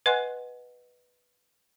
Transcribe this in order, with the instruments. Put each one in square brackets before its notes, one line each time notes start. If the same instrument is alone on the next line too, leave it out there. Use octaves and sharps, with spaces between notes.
[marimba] B4 D#5 F#5 G#5 C6 F#6